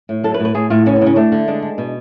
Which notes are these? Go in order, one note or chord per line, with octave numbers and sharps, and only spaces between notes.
A2
F#3 A4
B4
A2
B4
A2 G#4
A2 F4
C#3 C#4
B3
C#3 C#4
A3 D4
D3
G#3 D4
G#3
B2